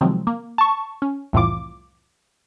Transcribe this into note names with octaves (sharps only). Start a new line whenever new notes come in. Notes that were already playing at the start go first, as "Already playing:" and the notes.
C3 D#3 F3 F#3 G#3 C4
A#3
A5 C#6
C#4
C2 F2 A2 E3 F4 D6